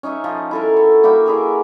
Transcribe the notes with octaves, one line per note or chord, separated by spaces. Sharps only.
C#4 D#4 D#5 E5
F3
E4 A4 A#4
F#3 A4
A#3 E4 F#4 G5
E4 G#4 A#4